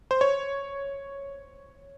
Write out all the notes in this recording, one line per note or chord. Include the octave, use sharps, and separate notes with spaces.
C5
C#5